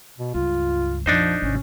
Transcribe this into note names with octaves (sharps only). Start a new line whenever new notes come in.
B2
C#2 G2 F4
A#1 F2 F3 D4 D#4 C5
G#1 C3 C#4